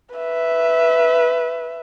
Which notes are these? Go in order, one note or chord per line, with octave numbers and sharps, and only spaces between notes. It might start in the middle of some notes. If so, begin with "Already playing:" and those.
B4 E5